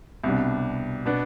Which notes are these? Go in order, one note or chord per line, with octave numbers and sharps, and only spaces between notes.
C2 B2 G3 D4
B2 B3 D4